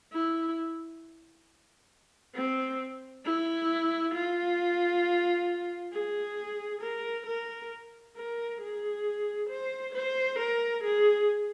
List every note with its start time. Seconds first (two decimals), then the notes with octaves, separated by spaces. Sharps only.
0.12 E4
2.35 C4
3.25 E4
4.14 F4
5.93 G#4
6.82 A#4
7.26 A#4
8.16 A#4
8.60 G#4
9.49 C5
9.95 C5
10.39 A#4
10.83 G#4